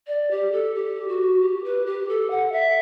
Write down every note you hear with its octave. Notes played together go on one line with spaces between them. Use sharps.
D5
G4
A4
G4
F#4
G4
B4
G4
A4
F#5
E5